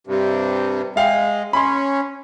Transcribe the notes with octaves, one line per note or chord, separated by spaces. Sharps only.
G2 C3
G#3 E5 F5 G5
C#4 B5 C6